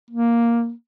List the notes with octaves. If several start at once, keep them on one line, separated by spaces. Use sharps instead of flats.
A#3